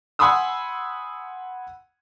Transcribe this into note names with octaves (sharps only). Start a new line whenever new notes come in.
F#5 G#5 B5 C6 D#6 E6